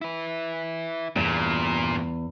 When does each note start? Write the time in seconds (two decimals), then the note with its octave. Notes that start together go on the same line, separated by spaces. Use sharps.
0.01 E4 B4
1.16 E2 G2 A#2 A#3